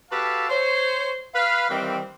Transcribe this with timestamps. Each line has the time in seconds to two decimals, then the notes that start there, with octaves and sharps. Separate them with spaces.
0.11 F#4 G4 A4 B4 F5 A5
0.49 C5 C#5
1.34 B4 F5
1.69 D#3 E3 G3 A#3 C4